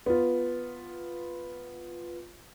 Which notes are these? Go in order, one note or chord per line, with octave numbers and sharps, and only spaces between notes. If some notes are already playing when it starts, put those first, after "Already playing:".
B3 F4